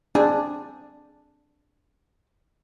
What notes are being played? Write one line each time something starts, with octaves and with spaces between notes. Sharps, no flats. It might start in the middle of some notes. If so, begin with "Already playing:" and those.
C4 D4 G#4